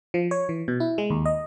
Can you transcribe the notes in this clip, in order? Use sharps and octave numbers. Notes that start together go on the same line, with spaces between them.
F3
C#5
E3
B2
E4
G#3
D#2
D#5